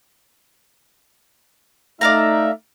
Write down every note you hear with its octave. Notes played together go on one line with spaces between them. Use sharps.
A3 D#4 D5 E5 F5 A#5